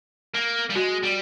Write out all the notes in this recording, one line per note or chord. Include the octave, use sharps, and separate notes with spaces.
A#3
G3
G#3 F#4
G3